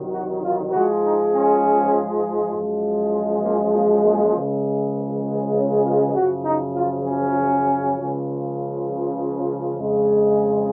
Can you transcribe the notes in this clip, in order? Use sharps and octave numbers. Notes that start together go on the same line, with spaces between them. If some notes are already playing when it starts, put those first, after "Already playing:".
Already playing: C2 C3 D#3 F#3
F#4
F4
G#2 F3 G#3 F#4
D#4
C#4
F#2 F3 G#3
A#3
A#3
A#3
C#2 C#3 F3 G#3
C#4
F4
F#2 C#3 F3 F#4
D#4
F4
C#4
C#2 C#3 F3
F2 C#3 G#3